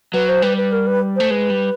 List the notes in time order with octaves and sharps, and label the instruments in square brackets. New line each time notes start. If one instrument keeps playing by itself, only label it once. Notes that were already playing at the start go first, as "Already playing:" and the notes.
[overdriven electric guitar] F#3 [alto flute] B4
[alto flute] C5
[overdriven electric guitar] G3 [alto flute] B4
[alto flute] B4
A#4
B4
[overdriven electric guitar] A3 [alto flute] C5
[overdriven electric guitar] G#3 [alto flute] B4
[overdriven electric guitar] G3